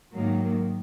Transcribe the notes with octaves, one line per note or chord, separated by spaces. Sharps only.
G#2 D#3 F#3 A#3